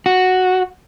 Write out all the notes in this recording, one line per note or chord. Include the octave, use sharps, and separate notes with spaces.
F#4